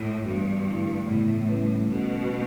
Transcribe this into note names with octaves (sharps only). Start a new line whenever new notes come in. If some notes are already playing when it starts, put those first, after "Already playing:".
Already playing: A2
G2 E3 B3 F#4
D3 A3 E4
A2 C#3 E3 B3 E4
G3 C#4 E4 B4
B2 A3 C#4 F#4 A4
A3 D4